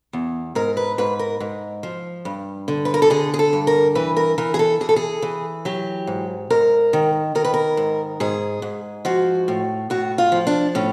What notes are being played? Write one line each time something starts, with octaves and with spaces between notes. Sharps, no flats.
E2
G#2 A#4
B4
G#2 B4
A#4
G#2
F3
G2
D3
B4
A#4
A4
D3 G#4
G#4
A4
G2
A#4
E3 B4
A#4
E3 A#4
G#4
A4
E3 G#4
A4
G#4
E3
F#3 G4
G#2
G#2 A#4
D#3
D#3 A#4
B4
A#4
G#2
G#2 G#4
G#2
F3 F#4
A2
A2 F#4
F4
F3
D4
A2 C#4